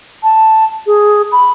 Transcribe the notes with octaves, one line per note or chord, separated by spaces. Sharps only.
A5
G#4
B5